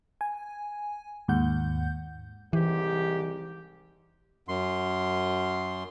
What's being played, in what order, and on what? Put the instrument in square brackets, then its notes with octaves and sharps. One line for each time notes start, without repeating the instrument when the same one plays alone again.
[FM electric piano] G#5
D#2 G#2 F#5 G6
[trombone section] C2 G#2 G4 [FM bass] E3
[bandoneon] F#2 C6